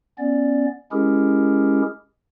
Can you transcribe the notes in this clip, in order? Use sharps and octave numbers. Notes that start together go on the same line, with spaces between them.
B3 C#4 D5
G#3 C#4 E4 G4 G#4 A#4